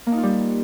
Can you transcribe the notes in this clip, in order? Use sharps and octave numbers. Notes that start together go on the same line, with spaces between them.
A#3
D#4
F4
G3